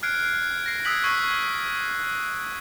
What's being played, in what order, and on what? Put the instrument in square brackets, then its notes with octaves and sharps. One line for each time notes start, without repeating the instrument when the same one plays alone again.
[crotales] F6 F#6 G#6 C7 D7
A#6 C7
D#6 E6 F#6 G#6 B6 F#7
C#6 E6 G#6 C7